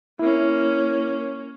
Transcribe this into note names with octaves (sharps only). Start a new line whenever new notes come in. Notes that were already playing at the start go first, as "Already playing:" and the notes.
A#3 C#4 E4